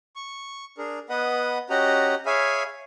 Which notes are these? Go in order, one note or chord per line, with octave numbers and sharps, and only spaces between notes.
C#6
D4 G#4 A#4
B3 B4 D#5 F#5 D#6
C#4 F#4 G4 D#5 F#5 A#5
G#4 C#5 E5 F5 G#5 B5